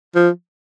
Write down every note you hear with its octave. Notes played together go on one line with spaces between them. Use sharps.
F3